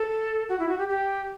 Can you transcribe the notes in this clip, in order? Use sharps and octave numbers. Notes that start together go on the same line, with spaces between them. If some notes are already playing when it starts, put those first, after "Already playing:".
Already playing: A4
F#4
E4
F#4
G4
G4